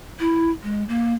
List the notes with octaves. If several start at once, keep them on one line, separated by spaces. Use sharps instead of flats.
E4
G#3
A#3